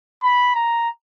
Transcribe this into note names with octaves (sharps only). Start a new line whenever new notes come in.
B5
A#5